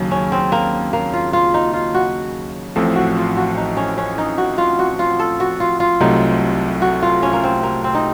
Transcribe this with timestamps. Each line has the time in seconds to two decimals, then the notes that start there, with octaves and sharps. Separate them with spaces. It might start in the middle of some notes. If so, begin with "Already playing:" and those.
Already playing: D#2 C#3 F#3
0.11 C#4
0.32 C4
0.52 A#3
0.93 A#3
1.13 F4
1.33 F4
1.54 D#4
1.74 F4
1.94 F#4
2.75 A1 A2 F3 C4 A4
2.96 F#4
3.16 F4
3.37 F#4
3.57 D#4
3.77 C#4
3.98 C#4
4.18 D#4
4.38 F#4
4.58 F4
4.79 F#4
4.99 F4
5.20 A4
5.40 F#4
5.60 F4
5.80 F4
6.00 C2 C3 F#3 A3 D#4
6.82 F#4
7.02 F4
7.23 C#4
7.33 A#3
7.44 C4
7.63 A#3
7.84 C4
7.95 D#4